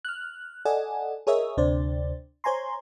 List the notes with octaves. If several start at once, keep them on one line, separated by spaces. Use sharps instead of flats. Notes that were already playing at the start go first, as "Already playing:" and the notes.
F6 F#6
A4 D5 D#5 F#5 G#5
G#4 A#4 C#5 D#5 E5
D2 C3 D4 C5 D5
C5 C#5 G#5 A#5 C6